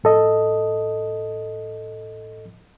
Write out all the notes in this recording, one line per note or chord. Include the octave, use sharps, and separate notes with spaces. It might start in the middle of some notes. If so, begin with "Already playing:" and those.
A2 A4 D#5